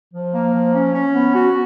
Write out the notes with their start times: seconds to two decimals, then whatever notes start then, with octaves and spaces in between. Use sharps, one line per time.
0.13 F3
0.33 A#3
0.53 F3
0.73 C#4
0.93 C#4
1.14 B3
1.34 F#4